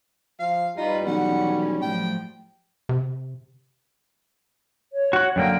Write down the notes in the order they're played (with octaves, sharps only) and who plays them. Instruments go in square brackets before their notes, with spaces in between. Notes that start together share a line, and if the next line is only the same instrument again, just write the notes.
[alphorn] F3 [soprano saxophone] F5
[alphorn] G3 [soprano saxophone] D#4 [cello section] F4 B4
[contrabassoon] B1 [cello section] E3 C#4 [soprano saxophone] F#5
[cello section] A2 F3 F#3 [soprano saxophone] G5
[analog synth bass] C3
[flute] C#5
[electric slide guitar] F#4 F#5
[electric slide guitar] F#2 D3 A#3 [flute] G5